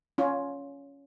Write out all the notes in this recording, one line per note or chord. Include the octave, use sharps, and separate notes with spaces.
C#4 F4